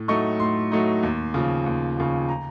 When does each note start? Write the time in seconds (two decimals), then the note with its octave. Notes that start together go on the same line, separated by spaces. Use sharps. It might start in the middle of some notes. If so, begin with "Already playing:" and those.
Already playing: A2
0.08 F#3 A3 D#4 C#6
0.40 A2 C6
0.72 F#3 A3 D#4
1.03 D#2
1.34 C#3 F3
1.66 D#2
1.97 C#3 F3
2.29 A#5